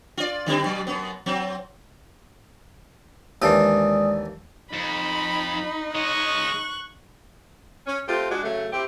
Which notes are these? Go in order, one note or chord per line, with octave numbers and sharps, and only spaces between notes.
F4 D5
D3 G3 C4
B2 F#3
F#2 B3
F#3 C4
D#2 E3 G#3 D4 D5 D#6
F2 D#4 B5
G#3 C#5 D#5 C#6 F#6
C#4
A3 C4 F4 G4
G#3 D4 F#4
C#3 F#3 A3
C4 E4 G4